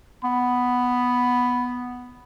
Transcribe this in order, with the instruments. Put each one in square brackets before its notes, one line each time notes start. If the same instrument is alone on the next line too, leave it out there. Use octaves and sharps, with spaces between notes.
[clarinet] B3 [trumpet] B5